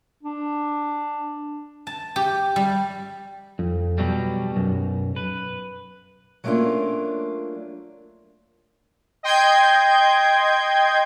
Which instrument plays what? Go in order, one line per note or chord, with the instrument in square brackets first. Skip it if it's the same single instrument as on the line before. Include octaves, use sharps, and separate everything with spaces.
[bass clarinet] D4
[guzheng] A5
G4
G3
[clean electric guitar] F2
B2 F#3 G3
B1 F#2
B4
[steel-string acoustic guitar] F#3 A3 A#3 C#4 D4 F4
[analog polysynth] D#5 G5 C6 G6 G#6